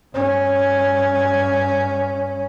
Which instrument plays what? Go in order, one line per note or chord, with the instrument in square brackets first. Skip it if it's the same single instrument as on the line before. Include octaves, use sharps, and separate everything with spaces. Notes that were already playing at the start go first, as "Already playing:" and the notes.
[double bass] G2 C#4